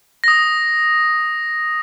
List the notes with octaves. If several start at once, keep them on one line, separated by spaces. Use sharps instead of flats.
D#6 A#6